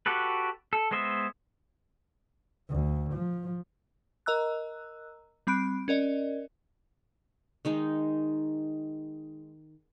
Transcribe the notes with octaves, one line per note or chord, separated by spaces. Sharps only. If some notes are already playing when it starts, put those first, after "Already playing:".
F#4 G4 A4 B4
A4
G#3 B3 C5 D#5 E5
D2
F3
A#4 D#5 A#5 E6 F#6
G3 C4 B5 F#6 D7
C#4 A#4 D5 D#5
D#3 G#3 D#4